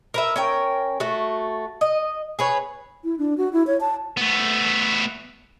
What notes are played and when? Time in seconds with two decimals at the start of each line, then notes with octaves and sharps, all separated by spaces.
0.14 A#4 B4 E5
0.36 C#4 A#4 G5
1.00 A3 F#4
1.81 D#5
2.39 G#4 B4 C#5
3.04 E4
3.19 D4
3.38 F#4
3.53 E4
3.67 C#5
3.81 A5
4.17 A3 B3